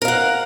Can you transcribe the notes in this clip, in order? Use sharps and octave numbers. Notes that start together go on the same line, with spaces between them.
A#4 F5 F#5